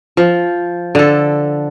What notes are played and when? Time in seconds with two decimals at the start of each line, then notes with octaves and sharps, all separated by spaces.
0.17 F3
0.95 D3 A4